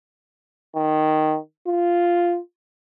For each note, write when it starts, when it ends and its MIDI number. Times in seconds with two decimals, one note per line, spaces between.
0.75 1.37 51
1.67 2.39 65